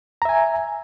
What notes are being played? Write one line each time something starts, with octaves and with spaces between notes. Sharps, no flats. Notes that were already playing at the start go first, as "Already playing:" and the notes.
E5 G#5 A#5